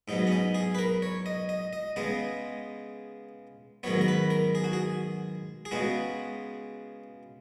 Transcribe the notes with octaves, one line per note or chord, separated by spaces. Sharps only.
G#2 F#3 B3 D#4
C#4
D#4
G#4
B4
A#4
C#5
D#5
D#5
D#5
C#3 G#3 B3 D#5
G#2 D#3 F#3 B3 C#5
A#4
B4
A#4
G#4
F#4
G#4
G#4
C#3 G#3 B3 F#4